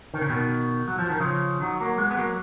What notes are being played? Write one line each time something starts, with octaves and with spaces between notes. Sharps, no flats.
D#3
C#3
B2 D#3
F#3
F3
D#3
C#3 F3
D#3 F#3
F#3 A#3
G#3 B3
B3
F#3 A#3